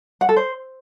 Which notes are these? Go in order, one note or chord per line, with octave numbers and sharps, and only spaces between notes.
F#5
A4
C5